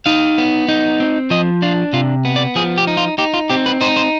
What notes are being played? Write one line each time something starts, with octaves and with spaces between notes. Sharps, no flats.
D#4 F5
B3
D#4
C4
F3 D#5
D4 F4
C3 F4
B3
D5
F3 G#4
G4
D#4
F4
D#4 G4
F4
C4 G4
B4
D#4 C5
C5